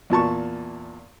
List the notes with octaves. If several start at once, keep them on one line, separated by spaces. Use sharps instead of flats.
E2 A#2 A5 C#6